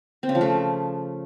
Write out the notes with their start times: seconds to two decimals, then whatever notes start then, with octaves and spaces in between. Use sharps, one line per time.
0.23 C4
0.29 C#3
0.35 F3
0.41 A3